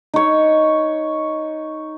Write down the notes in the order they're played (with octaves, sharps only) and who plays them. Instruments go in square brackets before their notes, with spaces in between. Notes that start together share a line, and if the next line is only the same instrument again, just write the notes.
[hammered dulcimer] D#4 C#5